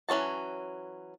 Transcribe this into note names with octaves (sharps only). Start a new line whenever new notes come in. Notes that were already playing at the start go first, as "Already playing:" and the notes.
E3 F#3 C#4 F#4 A5